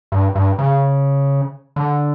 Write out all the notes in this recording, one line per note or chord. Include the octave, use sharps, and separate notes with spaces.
G2
G2
C#3
D3